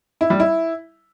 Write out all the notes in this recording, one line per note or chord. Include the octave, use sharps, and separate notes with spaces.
E4
G3
E4